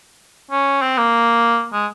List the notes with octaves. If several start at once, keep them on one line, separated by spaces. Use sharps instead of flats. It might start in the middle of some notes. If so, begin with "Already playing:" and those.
C#4
C4
A#3
G#3